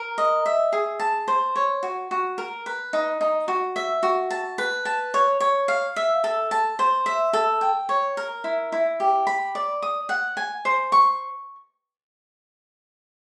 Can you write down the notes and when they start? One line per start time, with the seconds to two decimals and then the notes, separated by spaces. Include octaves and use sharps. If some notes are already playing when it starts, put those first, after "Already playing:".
Already playing: A#4
0.18 D#5
0.46 E5
0.72 G#4
1.00 A5
1.28 C5
1.56 C#5
1.83 F#4
2.11 F#4
2.38 A#4
2.66 B4
2.93 D#4
3.21 D#4
3.48 F#4
3.76 E5
4.03 F#4
4.30 A5
4.58 B4
4.85 A5
5.14 C#5
5.40 C#5
5.68 F5
5.96 E5
6.24 A4
6.51 A5
6.79 C5
7.06 E5
7.33 A4
7.61 G5
7.89 C#5
8.17 A#4
8.44 E4
8.72 E4
9.00 G4
9.27 B5
9.55 D5
9.82 D#6
10.09 F#5
10.37 G#5
10.65 C5
10.92 C#6